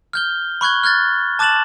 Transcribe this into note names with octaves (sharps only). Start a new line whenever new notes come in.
F6 G6 G7
B5 C#6 F#6 G#6 G7
F6 F#6 G#6 A6
A5 D6 F#6 A6 E7 F#7